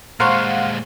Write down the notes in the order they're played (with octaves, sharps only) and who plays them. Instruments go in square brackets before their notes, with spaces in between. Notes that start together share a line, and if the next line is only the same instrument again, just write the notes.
[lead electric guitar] A#2 G#3 [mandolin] C5 [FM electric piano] F5 F#5 [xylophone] A#5 C6 C#6